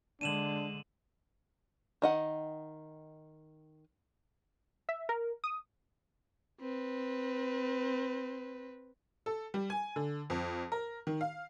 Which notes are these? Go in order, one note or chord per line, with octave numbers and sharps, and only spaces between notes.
D3 G#3 D4 D#7 E7 F#7
D#3 D#5 F#5
E5
A#4
D#6
C4 B4
A4
G3
G#5
D3
F2
A#4
D#3
F5